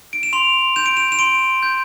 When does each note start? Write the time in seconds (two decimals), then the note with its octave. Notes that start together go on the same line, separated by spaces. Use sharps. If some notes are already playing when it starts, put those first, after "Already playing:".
0.13 D7
0.23 E7
0.33 C6 F7
0.76 G6 E7
0.86 D7
0.97 E7
1.12 E7
1.19 C6 D7
1.63 G6